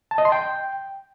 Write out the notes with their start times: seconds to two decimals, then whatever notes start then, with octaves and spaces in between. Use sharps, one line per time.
0.11 A5
0.18 D#5
0.25 C6
0.32 G5